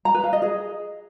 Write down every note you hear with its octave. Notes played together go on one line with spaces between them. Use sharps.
A#5
B4
F5
D#5
G#4